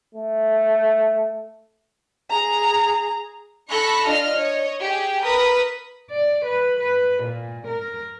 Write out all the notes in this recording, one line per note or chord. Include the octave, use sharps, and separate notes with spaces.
A3
G#4 A#5
A4 B5 C#6 F#6 A#6
D4 F4 D#5 F6
C#5 D#5
G4 G#4
A#4 B4 D#6
D5
B4
B4
A#2
A#4